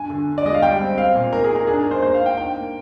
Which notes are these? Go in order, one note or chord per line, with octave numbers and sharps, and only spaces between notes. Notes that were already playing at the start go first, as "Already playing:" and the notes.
Already playing: G2 G#5
D3
G2
D5
G#3 D#5
F5
G3 G5
C4
C4 F5
A#2
G#2 A#4
G#4
G#2
A#4
D4 G#4
A#4
G2
C5
A#3 C5
F5
G#2
G5
D4 G5
A#3